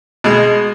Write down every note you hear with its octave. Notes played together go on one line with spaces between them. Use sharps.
B2 G#3